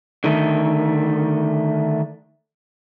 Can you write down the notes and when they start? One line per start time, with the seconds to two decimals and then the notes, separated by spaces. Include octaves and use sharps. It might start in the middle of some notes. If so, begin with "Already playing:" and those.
0.24 D3 D#3 A3